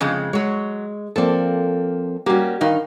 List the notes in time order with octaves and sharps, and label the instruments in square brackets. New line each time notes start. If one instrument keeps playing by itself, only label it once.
[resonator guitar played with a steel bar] F2 C#3 G#3
[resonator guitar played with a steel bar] F#3 C#5 [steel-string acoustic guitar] G#3
[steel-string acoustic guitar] F3 A#3 C4 [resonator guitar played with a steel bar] A4 D5
[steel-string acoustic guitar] G3 F#4 G4 [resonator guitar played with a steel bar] A#3 C#4
[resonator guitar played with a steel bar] G2 D#4 [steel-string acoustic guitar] D#3 F5